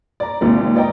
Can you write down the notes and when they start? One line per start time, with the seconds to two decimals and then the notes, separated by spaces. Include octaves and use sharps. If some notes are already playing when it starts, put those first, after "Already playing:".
0.20 D5 A#5
0.41 A#1 D#2 C3 G#3
0.75 B4 D5 D#5 G5 A#5